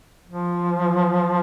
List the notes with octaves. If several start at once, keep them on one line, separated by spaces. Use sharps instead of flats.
F3